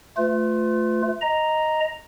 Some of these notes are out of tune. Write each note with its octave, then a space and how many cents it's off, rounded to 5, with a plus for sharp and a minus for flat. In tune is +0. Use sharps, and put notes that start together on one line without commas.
A3 +0 F4 +10 B4 +40
D#5 +0 A#5 +0